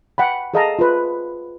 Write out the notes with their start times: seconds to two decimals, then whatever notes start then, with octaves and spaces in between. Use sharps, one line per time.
0.18 F#5 G5 B5
0.54 G#4 A4 D#5 F5 A5 A#5
0.79 F4 B4